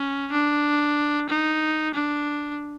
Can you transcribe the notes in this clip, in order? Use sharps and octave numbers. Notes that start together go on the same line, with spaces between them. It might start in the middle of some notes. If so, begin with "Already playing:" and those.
Already playing: C#4
D4
D#4
D4